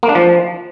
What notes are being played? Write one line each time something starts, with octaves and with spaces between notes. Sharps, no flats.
A#3
D4
F3